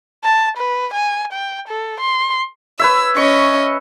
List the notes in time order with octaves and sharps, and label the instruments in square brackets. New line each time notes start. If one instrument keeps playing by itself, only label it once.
[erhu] A5
B4
G#5
G5
A4
C6
[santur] B4 C#5 E5 [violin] E6
[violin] C#4 D#5 [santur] C#6